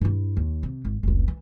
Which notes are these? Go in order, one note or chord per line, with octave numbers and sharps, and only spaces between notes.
G2 E4
D#2
C3
G#1
F1 C#2
E3